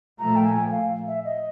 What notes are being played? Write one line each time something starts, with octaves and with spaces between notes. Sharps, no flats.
A#2 F3 A3 A#5
G5
G#5
F5
E5
D#5